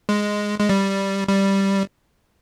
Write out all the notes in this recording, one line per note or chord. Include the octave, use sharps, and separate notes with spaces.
G#3
G#3
G3
G3